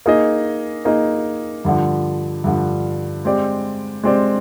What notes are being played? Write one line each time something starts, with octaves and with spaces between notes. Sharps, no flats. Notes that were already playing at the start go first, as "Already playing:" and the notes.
A#3 D#4 G#4 D#5
A#3 D#4 G#4 D#5
G2 D3 F3
G2 D3 F3
G#3 C4 G4 D5
G#3 C4 G4 D5